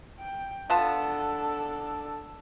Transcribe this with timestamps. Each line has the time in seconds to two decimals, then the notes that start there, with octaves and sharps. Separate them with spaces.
0.20 G5
0.70 B3 D4 F4 A4 A5